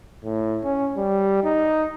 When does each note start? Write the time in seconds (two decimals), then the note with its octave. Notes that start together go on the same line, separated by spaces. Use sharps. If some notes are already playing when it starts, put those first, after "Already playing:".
0.24 A2
0.64 C#4
0.97 G3
1.44 D#4